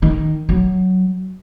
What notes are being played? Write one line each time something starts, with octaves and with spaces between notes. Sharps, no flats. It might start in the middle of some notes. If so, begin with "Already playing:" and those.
D#3
F#3